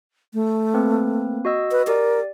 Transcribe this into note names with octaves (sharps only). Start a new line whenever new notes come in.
A3
A#3 C4 B4
F#4 D#5 E6
B4
G4 A#4 D5